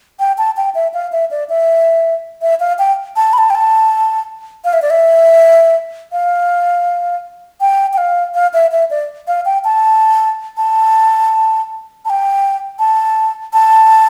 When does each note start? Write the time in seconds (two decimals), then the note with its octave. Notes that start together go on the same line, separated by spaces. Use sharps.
0.20 G5
0.38 A5
0.57 G5
0.75 E5
0.94 F5
1.12 E5
1.31 D5
1.49 E5
2.42 E5
2.60 F5
2.79 G5
3.16 A5
3.33 B5
3.38 A5
3.50 G5
3.55 A5
4.65 F5
4.73 E5
4.82 D5
4.90 E5
6.12 F5
7.61 G5
7.93 G5
7.98 F5
8.34 F5
8.53 E5
8.72 E5
8.90 D5
9.28 F5
9.45 G5
9.64 A5
10.57 A5
12.05 A5
12.10 G5
12.79 A5
13.53 A5